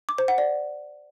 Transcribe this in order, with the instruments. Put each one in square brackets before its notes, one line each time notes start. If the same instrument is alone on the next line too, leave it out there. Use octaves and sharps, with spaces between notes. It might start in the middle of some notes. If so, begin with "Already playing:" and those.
[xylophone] D6
C5
F#5
D5